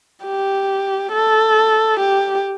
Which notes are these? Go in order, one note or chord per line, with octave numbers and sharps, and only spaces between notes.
G4
A4
G4